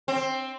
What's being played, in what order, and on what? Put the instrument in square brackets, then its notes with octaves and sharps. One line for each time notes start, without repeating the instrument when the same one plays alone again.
[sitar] C4